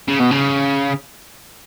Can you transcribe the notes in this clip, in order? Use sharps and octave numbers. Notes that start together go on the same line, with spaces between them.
C#3
B2
C#3